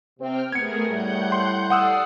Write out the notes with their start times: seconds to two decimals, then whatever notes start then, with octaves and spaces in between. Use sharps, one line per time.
0.20 C3 C4 G5 F6
0.52 A3 B3 G#4 A#4 G#6 C#7
0.89 A2 G3 F#5 G6
1.32 C6
1.70 A4 D5 F#5 D#6 E6 C7